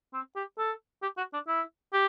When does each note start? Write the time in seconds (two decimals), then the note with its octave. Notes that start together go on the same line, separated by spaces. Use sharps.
0.13 C4
0.36 G4
0.58 A4
1.02 G4
1.17 F#4
1.33 D4
1.48 E4
1.93 G4